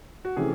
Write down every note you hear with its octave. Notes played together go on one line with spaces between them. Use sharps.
F#4
C3 E3 A3 C#4 G#4